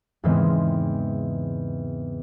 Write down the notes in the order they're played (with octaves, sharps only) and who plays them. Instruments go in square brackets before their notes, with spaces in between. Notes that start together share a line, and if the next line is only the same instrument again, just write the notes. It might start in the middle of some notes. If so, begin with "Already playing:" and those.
[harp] E2 G#2 C#3 E3 G#3 C4